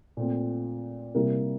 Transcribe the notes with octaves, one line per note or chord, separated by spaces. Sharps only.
A#2 A3 C4
C3 G3 A#3 E4 A#4